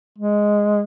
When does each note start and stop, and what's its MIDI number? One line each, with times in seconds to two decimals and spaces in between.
0.18 0.83 56